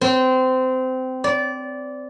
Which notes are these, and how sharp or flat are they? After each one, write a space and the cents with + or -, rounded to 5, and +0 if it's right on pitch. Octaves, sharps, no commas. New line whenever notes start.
C4 -20
D5 -20